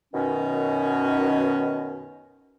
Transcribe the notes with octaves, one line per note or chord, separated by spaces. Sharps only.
F#2 B2 D#3 C#4